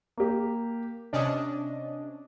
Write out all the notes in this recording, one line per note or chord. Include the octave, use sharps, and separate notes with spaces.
A#3 G4
C3 C#4 D4 D#5 D#6